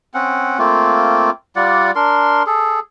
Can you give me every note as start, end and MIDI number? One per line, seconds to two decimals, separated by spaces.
0.14 0.58 60
0.14 0.58 61
0.14 0.58 78
0.59 1.30 57
0.59 1.30 58
0.59 1.30 60
0.59 1.30 65
1.56 1.91 55
1.56 1.91 65
1.56 1.91 74
1.56 1.91 78
1.96 2.43 62
1.96 2.43 70
1.96 2.43 84
2.47 2.80 68
2.47 2.80 69